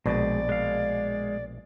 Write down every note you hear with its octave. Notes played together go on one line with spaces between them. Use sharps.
A#1 B2 G#3 D5
G#3 F5